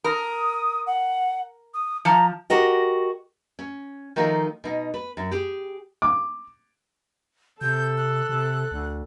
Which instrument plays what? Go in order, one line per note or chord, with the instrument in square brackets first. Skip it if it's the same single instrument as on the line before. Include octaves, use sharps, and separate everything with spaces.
[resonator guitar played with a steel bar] A#4 [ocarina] D#6
[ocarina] F#5
D#6
[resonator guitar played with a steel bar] F3 [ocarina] A#5
[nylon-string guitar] F#4 G4 A#4 D#5 G5
C#4
D#3 F3 A3 D#4 F4
B2 D#4
B4
F#2
G4 G#4
[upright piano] D6
[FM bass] C3 [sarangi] A4 [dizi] G6
[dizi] F#6
[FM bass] C3
D2